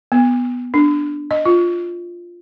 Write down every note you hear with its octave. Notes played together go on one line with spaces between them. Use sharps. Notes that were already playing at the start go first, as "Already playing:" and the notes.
B3
D4
D#5
F4